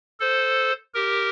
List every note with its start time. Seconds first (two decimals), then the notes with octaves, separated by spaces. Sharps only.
0.20 A4 C5
0.94 G4 A#4